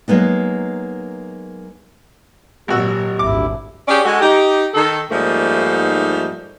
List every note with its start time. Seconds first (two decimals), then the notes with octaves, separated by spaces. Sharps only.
0.08 F#3 G#3 A#3 B3 D#4
2.68 G#1 A#2 F#3 F#4 G4 E6
3.19 G#1 D2 E4 D6
3.88 C#4 G4 G#4 C#5 D5
4.05 G#3 F#4 A4
4.21 D#4 G4
4.74 D#3 A4
5.11 G#2 F3 G3 A3 A#3 D#4